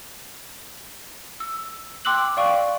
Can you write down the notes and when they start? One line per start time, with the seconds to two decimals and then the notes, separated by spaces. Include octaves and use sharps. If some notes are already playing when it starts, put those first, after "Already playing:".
1.40 E6
2.05 G5 C6 D6 E6 F#6 F#7
2.37 D5 F5 G5 C#6